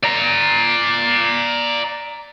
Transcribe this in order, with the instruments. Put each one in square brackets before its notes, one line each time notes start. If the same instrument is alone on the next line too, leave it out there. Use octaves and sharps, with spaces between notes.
[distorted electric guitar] D5 A#5